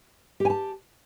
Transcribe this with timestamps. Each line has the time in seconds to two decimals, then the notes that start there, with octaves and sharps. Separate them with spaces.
0.40 G4
0.45 G#5
0.50 A5